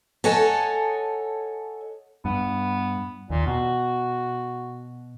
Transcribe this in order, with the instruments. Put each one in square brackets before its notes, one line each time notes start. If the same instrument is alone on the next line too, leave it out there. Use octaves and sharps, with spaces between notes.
[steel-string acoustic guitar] A4 C#5 D#5 F#5 G#5 A5
[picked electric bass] G2 [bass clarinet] B3
[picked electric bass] D#2 [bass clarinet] A#2
[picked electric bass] B2 [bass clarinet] F#4